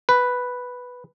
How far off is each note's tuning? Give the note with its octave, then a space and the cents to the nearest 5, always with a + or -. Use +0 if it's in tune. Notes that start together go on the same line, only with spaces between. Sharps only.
B4 +0